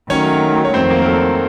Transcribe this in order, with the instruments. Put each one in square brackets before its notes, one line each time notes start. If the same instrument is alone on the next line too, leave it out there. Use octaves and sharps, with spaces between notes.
[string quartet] D#3 F#3 A3 [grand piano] C#4 C#5
[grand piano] C#5
[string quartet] F2 D#3 F#3 A3 [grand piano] C4 C5
[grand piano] A#3 A#4
A#4
A4